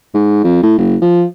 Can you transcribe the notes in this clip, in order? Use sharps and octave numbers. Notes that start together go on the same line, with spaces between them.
G#2
F2
A2
F#1
F3